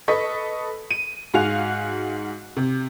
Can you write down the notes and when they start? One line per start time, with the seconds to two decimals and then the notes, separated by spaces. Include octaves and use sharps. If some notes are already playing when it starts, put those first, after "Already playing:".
0.08 A4 B4 D#5 C#6 B6
0.91 D#7
1.34 G#2 F#4 F5 G#5 F#6 F7
2.57 C3